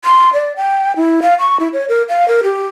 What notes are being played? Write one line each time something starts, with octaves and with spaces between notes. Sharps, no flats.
C6
D5
G5
E4
F5
C#6
E4
C#5
A#4
F5
A#4
G4